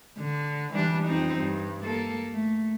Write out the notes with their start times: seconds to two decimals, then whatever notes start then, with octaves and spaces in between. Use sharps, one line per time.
0.18 D3
0.73 E3 G3 D4
1.07 F2 C4 D#4
1.39 G2
1.83 A#3 A4
2.32 A3